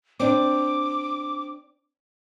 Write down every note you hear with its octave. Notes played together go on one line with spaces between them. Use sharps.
C4 D4 D6